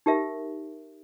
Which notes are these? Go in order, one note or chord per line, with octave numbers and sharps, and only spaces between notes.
D#4 G4 A#4 E5